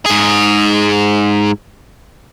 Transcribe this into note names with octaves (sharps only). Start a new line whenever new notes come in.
G#2 G#4